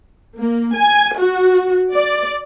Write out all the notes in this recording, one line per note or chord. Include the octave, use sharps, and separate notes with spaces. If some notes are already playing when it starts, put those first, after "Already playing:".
A#3
G#5
F#4
D5